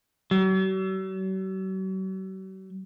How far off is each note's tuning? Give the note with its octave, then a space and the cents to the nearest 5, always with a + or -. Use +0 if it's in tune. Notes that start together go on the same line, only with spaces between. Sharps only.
F#3 +45